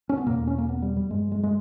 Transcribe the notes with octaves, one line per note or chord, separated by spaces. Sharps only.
C#4
B3
E2 B2 A#3
C#4
A#3
B3
G3
G3
G2 G#3
G#3
G#3